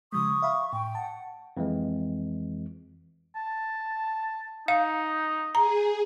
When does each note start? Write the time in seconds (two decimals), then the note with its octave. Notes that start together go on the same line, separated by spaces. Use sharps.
0.13 C#3 F3 G#3 C#6 D#6
0.42 E5 F5 B5
0.73 A2 G5
0.95 F#5 A5
1.57 F2 E3 G#3
3.36 A5
4.68 D#4 F5
5.55 G#4 A#5